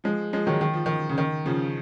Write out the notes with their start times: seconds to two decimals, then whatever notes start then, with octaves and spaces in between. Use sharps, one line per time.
0.04 F3 G#3
0.33 F3 G#3
0.47 D#3 F#3
0.61 D#3
0.74 F3
0.86 D#3
1.10 C#3
1.18 D#3
1.46 C#3 F3